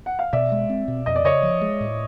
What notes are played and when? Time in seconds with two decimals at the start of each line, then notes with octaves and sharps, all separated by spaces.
0.06 F#5
0.19 F5
0.33 B2 D5 E5
0.52 G#3
0.70 C4
0.88 B2
1.06 F2 D#5
1.16 D5
1.24 C#3 C#5 D#5
1.43 F3
1.62 G#3
1.81 A2